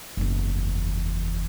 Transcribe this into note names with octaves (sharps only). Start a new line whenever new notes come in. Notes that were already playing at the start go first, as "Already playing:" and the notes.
F#1 E2